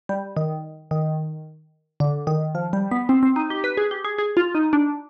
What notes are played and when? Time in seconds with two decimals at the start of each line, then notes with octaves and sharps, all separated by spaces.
0.09 G3
0.37 D#3
0.91 D#3
2.00 D3
2.27 D#3
2.55 F3
2.73 G3
2.91 B3
3.09 C4
3.23 C4
3.36 D#4
3.50 G4
3.64 B4
3.77 G#4
3.91 G4
4.05 G#4
4.18 G#4
4.37 F4
4.55 D#4
4.73 D4